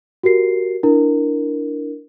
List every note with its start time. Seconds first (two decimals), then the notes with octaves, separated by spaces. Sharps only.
0.23 F#4 G4 A#4 C7
0.83 D4 E4 A#4